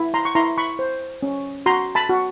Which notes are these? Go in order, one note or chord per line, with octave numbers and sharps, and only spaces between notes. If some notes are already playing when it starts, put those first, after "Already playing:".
Already playing: E4
A#5 C6
C#6
E4 A#5 C6
B5 C#6
C5
C#4
F#4 A#5 C6
A5 B5
F#4